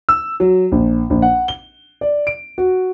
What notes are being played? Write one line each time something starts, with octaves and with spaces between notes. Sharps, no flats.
E6
F#3
A#1
A#1
F#5
G7
D5
D7
F#4